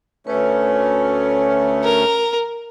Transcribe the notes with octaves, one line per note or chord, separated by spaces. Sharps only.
D2 A3 C#4 B4 C#5
A#4